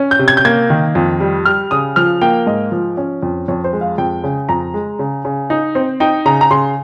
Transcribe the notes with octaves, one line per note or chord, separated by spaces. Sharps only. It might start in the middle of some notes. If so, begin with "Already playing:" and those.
Already playing: C#4
G6
C3
G#6
G6
A#3 G#6
D#3
F2
G3
G3 F6
C#3 D#6
F3 F6
A#3 G5
G#2 D#5
F3
C#4
F2
F2 C#5
C5
G#3
F5
F2 G5
C#3
F2 A#5
G#3
C#3
C#3
D#4
C4
D#4 G5
C#3 A#5
A#5
C#3 C6